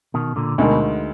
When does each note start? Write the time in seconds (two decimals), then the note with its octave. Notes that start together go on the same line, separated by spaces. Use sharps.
0.14 B2 D#3
0.36 A#2 D3
0.58 D2 B2 D3 G#3 D#4 A#4